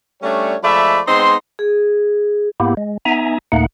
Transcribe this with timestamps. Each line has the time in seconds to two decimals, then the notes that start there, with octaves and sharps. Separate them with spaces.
0.22 G3 A3 C#4 D4 C#5
0.63 F3 G#3 A3 D5 E5 B5
1.07 G#3 B3 C4 D#4 C6
1.59 G#4
2.60 G#2 A#3 B3 E4 G4
2.77 G#3
3.05 B3 D#4 E5 G#5 A#5
3.52 D#2 A#2 A3 A#3 D#4 F#5